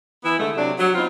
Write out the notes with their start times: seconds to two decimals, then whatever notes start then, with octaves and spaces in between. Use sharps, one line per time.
0.24 E3 B3 E4
0.38 D3 G#3 A3
0.57 C3 F#3 D4
0.79 F#3
0.95 B3 C4 D#4 F4